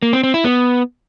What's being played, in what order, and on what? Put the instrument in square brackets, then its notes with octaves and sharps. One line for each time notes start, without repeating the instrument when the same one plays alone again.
[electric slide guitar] A#3
C4
C4
E4
B3